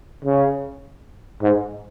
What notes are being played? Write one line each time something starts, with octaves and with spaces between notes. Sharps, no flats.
C#3
G#2